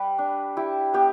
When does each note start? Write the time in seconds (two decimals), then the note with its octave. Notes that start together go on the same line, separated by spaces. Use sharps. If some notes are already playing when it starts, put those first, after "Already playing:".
Already playing: G3 G4 B4
0.18 D4
0.57 E4 G4
0.94 B3 G4